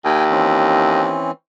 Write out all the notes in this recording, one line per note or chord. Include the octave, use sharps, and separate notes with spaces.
D#2 G5 G#5
E3 C4 C#4